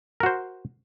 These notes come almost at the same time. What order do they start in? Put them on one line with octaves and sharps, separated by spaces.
A#4 F#4 C5